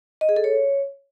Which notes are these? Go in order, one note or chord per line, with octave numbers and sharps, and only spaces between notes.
D#5
G#4
A4
C#5